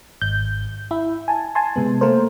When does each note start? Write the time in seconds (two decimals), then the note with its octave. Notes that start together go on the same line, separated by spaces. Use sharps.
0.22 G#1 G6
0.91 E4 E5
1.28 G#5 A5
1.55 G#5 A5 C6
1.76 C3 G#3 B3
2.01 A3 A#3 A#4 C5